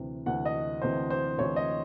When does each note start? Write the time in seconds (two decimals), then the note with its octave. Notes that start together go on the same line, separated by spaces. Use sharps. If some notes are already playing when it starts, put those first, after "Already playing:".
Already playing: D2 C3 E3
0.26 D2 C3 E3 F#5
0.45 D#5
0.82 D2 C3 E3 C5
1.10 C5
1.38 D2 C3 E3 C#5
1.56 D#5